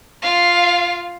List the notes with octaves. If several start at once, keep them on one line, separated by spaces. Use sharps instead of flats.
F4 F5